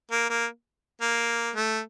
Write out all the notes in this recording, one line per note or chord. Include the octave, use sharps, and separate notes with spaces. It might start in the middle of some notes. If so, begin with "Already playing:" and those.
A#3
A#3
A#3
A3